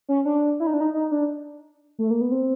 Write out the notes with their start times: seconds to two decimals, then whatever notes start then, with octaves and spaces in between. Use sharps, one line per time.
0.09 C#4
0.25 D4
0.60 E4
0.67 D#4
0.74 D4
0.81 D#4
0.94 D#4
1.11 D4
1.99 A3
2.11 A#3
2.21 B3
2.32 C4